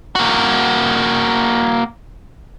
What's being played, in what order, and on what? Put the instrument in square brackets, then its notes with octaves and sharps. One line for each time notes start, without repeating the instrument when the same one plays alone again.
[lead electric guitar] A#3 F#4